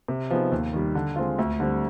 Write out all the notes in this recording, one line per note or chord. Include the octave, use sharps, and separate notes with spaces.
C3
F3 B3 D#4 G#4
D#2
D#3 G3
D3
G#3 C4 F4
D2
D3 G3 C4